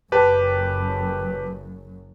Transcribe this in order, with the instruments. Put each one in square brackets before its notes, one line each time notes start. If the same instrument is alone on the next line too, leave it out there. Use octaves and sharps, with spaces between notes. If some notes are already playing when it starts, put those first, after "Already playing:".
[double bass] F#1 F#2 [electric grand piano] G4 B4 A5